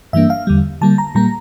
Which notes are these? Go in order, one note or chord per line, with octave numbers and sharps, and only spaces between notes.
G2 E3 G3 A#3 D4 E5
F5
E2 D3 G3
D3 G3 A#3 A5
A#5
A#2 G3 A#3 A#5